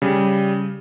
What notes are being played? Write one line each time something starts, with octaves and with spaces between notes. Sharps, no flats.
C#3 G3